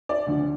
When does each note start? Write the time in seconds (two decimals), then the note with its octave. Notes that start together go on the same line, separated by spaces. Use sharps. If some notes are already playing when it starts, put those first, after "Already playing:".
0.09 D5
0.27 D2 D3 F3